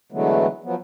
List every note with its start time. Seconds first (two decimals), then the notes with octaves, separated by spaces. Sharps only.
0.12 D3 E3 F#3 G#3 A3 B3
0.64 F3 F#3 B3